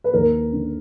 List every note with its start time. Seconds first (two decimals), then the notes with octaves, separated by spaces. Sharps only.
0.04 B4
0.14 D#2 A#4
0.53 D3